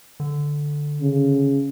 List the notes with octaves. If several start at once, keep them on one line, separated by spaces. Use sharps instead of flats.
D3
C#3